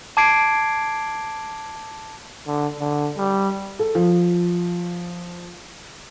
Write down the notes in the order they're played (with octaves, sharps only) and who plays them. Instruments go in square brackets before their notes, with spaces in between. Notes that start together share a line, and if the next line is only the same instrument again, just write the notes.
[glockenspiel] A5 D6 G#6 C7 D7
[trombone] D3
D3
G3
[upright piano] A4
F3